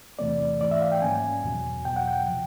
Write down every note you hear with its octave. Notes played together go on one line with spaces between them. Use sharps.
E2 C3 E3 A3 C4 D5
G#2 E3 A3 D5
E5
F5
G5
G#2 D#3 F#3 A#3 C#4 G#5
E2 B2 F#3
E2 B2 F#3 G5
F#5
G5
C3 F3